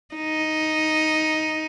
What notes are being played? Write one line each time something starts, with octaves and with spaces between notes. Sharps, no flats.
D#4